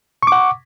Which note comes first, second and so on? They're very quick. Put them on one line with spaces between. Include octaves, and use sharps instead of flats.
C#6 D6 F#5